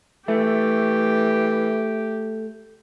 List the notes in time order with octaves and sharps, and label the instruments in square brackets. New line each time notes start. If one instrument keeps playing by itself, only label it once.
[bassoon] E3 [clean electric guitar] A3 [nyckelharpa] G4